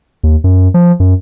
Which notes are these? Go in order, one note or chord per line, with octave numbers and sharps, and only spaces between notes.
D#2
F#2
F3
F#2